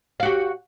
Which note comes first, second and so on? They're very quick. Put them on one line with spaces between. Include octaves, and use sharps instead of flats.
F5 F#4 G4